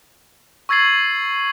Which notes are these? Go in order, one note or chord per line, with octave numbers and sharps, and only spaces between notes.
C#6 E6 G#6 A6 C7 F#7